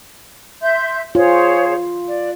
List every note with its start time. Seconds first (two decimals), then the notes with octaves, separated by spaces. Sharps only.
0.61 E5 C6 G6
1.15 F4 G#4 C5 C#5
2.08 D5